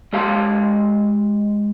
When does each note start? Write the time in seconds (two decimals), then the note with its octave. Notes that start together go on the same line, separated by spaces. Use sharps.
0.13 G#3 G4 F5 A#5 C6